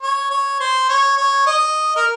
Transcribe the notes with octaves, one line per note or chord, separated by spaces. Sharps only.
C#5
C#5
C5
C#5
C#5
D#5
A#4